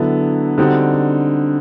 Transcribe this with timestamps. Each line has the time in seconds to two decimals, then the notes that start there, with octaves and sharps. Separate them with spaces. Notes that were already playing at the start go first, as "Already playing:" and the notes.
Already playing: D3 F#3 B3 E4 A4
0.58 D3 G3 C4 D#4 F#4